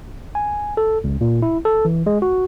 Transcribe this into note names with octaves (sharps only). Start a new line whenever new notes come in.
G#5
A4
C#2
A#2
E4
A4
E3
G#3
F#4